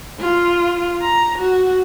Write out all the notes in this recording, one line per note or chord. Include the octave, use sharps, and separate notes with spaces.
F4
A#5
F#4